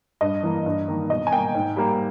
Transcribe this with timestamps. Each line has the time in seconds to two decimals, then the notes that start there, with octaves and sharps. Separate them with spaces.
0.21 G2 D#5
0.43 E3 A#3
0.66 G2
0.88 D#3 A#3
1.10 B2 D#5
1.27 G#5
1.32 A#3 G5
1.55 G#2
1.77 G3 A#3